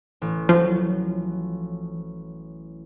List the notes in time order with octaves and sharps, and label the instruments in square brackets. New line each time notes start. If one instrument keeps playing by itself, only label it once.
[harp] A1
[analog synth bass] F3 [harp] F#3